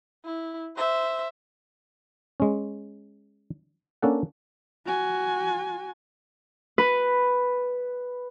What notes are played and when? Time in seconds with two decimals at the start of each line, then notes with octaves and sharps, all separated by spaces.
0.25 E4
0.76 C5 E5
2.40 G#3 C#4
4.02 A#3 C#4 D4 A4 F#5
4.87 F#4 G#5
6.78 B4